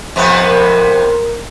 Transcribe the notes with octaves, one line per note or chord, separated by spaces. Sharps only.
F2 C3 B3
A#4